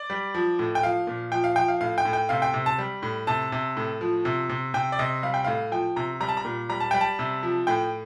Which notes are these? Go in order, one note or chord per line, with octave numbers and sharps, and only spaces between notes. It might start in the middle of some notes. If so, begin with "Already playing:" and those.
Already playing: D5
G3
F3
A2
G5
F3 F5
A#2
F3 G5
F5
F3 G5
F5
A2 F5
G5
A2
G5
C3 F5
G5
C3
A5
G3
A2
C3 A5
C3
A2
F3
C3
C3
C3 G5
D5
C3 D#5
G3 F5
G5
A2 F5
F3 G5
C3 A#5
G3 A#5
A5
A#5
A#2
G3 A#5
A5
G3 G5
A5
C3
F3
A2 G5